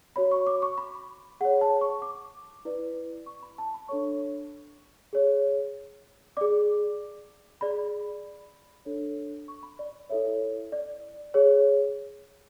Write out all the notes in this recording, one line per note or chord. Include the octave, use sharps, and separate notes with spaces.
F#4 C#5 B5
C#6
D6
C#6
B5
G#4 C#5 F#5
A5
C#6
D6
E4 B4 D5
C#6
B5
A5
B5
D4 A4 C#5 C#6
G#4 C#5
G#4 D5 D6
G#4 D5 B5
D4 A4 C#5
C#6
B5
D5
E4 A4 C#5 E5
D5
G#4 C#5